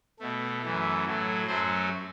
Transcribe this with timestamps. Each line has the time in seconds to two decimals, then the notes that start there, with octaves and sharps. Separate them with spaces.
0.19 B2 A3
0.62 F#2 E3 A3
1.04 A2 F#3 A3
1.47 F#2 F#3 A3 C5